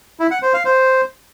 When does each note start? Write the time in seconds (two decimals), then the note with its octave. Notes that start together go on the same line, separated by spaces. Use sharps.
0.20 E4
0.31 F#5
0.42 C5
0.54 F5
0.65 C5